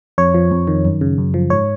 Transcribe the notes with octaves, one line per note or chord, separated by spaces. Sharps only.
F2 C#5
F3
F2
D#3
F#2
C#3
F#2
F3
G#2 C#5